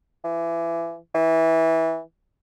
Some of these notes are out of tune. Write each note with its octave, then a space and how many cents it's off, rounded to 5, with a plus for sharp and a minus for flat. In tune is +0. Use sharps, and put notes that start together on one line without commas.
E3 +25
E3 -15